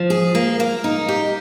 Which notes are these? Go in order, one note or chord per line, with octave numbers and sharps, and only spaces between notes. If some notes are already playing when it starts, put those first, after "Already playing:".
Already playing: F3
G#4
A#3
A#3
D#4
G4